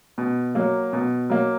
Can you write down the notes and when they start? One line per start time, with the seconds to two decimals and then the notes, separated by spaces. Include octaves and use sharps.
0.18 B2
0.55 F#3 A#3
0.93 B2
1.30 F#3 A#3